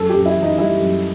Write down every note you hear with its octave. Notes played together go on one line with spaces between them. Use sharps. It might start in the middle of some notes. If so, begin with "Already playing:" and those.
Already playing: F#2 A4
G4
F#2
E4
E3
D#4
G3 E4
F#2